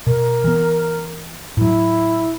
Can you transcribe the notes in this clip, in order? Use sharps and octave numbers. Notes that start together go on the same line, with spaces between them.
B2 A#4
E3 B3
A2 F#3 E4